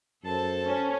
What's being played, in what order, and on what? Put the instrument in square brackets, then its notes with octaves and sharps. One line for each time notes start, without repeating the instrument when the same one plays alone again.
[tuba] F#2 [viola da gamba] A4 C5 [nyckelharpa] A5
[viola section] C#4